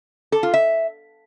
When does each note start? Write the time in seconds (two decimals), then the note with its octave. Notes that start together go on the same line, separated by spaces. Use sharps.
0.32 A4
0.43 F4
0.54 E5